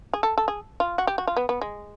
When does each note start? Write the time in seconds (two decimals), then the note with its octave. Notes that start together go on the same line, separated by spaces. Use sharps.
0.13 G#4
0.23 A4
0.38 A4
0.48 G#4
0.80 F4
0.98 F#4
1.07 G4
1.18 F#4
1.27 F4
1.37 B3
1.49 B3
1.61 G#3